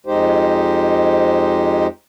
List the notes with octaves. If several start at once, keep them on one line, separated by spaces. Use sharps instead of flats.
F2 G#3 D#4 G4 C5